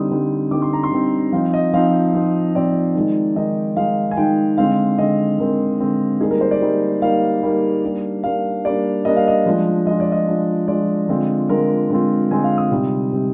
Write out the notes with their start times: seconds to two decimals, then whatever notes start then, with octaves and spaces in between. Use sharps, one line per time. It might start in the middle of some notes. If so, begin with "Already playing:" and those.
Already playing: D3 G3 C4 D#4 D#6
0.11 D3 G3 C4 D#4
0.51 D3 G3 C4 D#4 D6
0.62 C6
0.73 A#5
0.84 C6
0.92 D3 G3 C4 D#4
1.32 F3 C4 D#4 F5
1.54 D#5
1.74 F3 C4 D#4 F5
2.14 F3 C4 D#4
2.55 F3 C4 D#4 D5
2.95 D#3 G#3 D#4
3.36 D#3 G#3 D#4 D#5
3.76 D#3 G#3 D#4 F5
4.11 G#5
4.17 D#3 G#3 D#4 G5
4.58 D3 G#3 C4 F5
4.98 D3 G#3 C4 D#5
5.39 D3 G#3 C4 A#4
5.80 D3 G#3 C4
6.21 G3 A#3 D#4 G#4
6.31 A#4
6.41 C5
6.51 D5
6.61 G3 A#3 D#4
7.02 G3 A#3 D#4 F5
7.43 G3 A#3 D#4
7.83 G3 A#3 D4
8.23 G3 A#3 D4 F5
8.65 G3 A#3 D4 D5
9.05 G3 A#3 D4 D#5
9.16 F5
9.28 D#5
9.46 F3 G#3 D4 F4
9.87 F3 G#3 D4 F4 D#5
10.00 D5
10.12 D#5
10.27 F3 G#3 D4 F4
10.68 F3 G#3 D4 F4 D5
11.09 D3 G#3 C4 F4
11.49 D3 G#3 C4 F4 A#4
11.90 D3 G#3 C4 F4
12.31 D3 G#3 C4 F4 G#5
12.44 F5
12.58 D#6
12.71 C3 G3 C4 D#4
13.12 C3 G3 C4 D#4